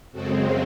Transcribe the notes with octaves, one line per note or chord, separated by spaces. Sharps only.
F#2 C#3 G#3 C4 F#4 A4